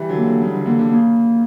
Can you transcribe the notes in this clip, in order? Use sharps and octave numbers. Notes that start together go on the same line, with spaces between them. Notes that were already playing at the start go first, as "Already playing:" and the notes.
Already playing: E3 G3
D3 F#3
A#3
D3
C#3 G3
D3
D3 A#3
D3
C#3 A#3